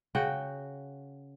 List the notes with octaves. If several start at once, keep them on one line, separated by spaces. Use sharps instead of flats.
C#3 F#4 F#5 G5